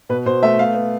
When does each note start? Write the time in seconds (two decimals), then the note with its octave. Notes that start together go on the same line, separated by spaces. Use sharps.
0.09 B2 B4
0.26 B2 C5
0.43 A3 E5
0.59 B3 F5
0.74 B3